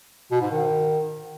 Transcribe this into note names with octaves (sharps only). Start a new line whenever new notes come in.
B2
G#2
D#3